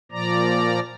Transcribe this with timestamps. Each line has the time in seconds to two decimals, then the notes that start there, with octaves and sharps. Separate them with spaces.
0.12 A#2 F3 D5 A#5